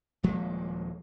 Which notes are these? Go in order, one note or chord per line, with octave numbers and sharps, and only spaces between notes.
D#1 F3 G#3 A#3